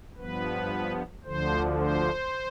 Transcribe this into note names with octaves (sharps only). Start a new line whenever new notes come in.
G2 F3 B3 B4
D2 D3 F3 C5
C5